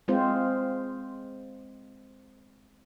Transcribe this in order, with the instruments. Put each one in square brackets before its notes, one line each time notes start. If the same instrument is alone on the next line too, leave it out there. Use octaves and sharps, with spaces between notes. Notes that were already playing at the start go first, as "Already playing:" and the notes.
[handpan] G#3 C4 F4 C5